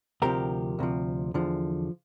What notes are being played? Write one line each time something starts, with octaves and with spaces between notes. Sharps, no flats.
D2 C3 F3 G4 A#4
D2 C3 F3
E2 D3 F3